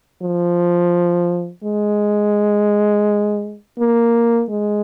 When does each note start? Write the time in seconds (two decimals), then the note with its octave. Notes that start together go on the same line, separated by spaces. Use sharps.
0.22 F3
1.64 G#3
3.79 A#3
4.49 G#3